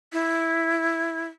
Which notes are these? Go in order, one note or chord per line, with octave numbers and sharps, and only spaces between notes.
E4